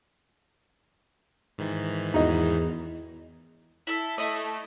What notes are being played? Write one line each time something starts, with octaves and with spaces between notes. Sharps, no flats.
G#2 D#3 E3
E2 D#4 F#4 D#5
E4 A4
A3 E4 D#5